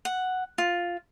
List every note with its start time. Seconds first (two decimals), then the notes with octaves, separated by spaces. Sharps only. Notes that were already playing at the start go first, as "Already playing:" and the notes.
0.05 F#5
0.58 F4